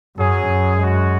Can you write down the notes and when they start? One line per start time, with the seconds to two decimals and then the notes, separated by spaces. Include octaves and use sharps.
0.17 F#2 F#3 C#4 G#4
0.48 F#2
0.78 G#3 C#4 F#4